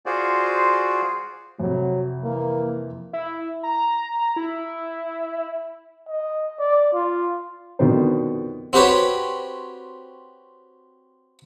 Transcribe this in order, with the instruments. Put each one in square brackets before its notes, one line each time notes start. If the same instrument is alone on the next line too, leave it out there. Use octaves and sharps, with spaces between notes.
[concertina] F4 F#4 G#4 C5 D5
[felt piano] F2 C3 [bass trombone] F#3
[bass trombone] E3 [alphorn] A#3
[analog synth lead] E4
A#5
E4
[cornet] D#5
D5
F4
[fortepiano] F2 B2 D3 D#3 B3 C5
[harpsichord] C4 F#4 G4 B4 C#5